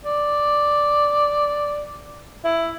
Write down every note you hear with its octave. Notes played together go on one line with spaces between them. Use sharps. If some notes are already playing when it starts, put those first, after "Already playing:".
D5
E4